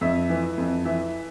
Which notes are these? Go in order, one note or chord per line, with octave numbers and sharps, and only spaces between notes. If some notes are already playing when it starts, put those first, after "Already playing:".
F2 E5
E3
F2
E3 E5